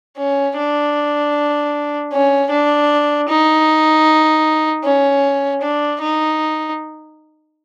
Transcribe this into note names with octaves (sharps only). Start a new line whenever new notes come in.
C#4
D4
C#4
D4
D#4
C#4
D4
D#4